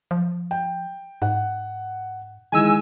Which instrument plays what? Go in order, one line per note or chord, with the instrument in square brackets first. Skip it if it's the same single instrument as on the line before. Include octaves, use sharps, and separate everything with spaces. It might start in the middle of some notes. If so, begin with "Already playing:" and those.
[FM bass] F3
[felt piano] G5
[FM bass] G#2 [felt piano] F#5
[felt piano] D#3 E3 G#3 [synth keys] G#5 E6